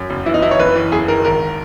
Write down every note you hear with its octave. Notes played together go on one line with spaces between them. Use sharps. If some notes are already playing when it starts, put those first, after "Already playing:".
Already playing: F#2
F#1
E3 E4
D#4
E3 E4
C#5
F#1 B4
E3
F#1 G#4
D#3 A#4
G#1 A#4